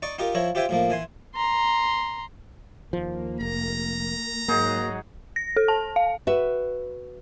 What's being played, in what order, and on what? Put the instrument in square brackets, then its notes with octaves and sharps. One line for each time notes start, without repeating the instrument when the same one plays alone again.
[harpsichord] D#4 D5 C#6
D#4 F4 G4 A#4
F3 E4 C#5 A#5
F4 G4 C5 E5 G5 G#5
A2 F3 A#3
E3 G#5 C6
[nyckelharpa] A#5 C6
[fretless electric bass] D#2 F3 [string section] A#3
[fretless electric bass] F1 [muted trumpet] A#5
[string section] G#2 F#3 [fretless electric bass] A#3 [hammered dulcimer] D#4 F#4 G#4
[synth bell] A#6
A4
A5
F5
[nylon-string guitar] F#4 B4 E5